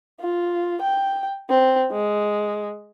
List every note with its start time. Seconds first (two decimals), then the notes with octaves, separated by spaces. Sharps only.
0.20 F4
0.81 G5
1.50 C4
1.91 G#3